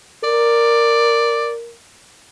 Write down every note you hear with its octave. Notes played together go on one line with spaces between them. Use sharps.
A#4 D5